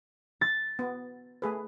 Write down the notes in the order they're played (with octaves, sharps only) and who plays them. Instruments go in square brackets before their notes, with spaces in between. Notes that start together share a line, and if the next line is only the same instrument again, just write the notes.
[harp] A6
[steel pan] B3
A3 G#4 B4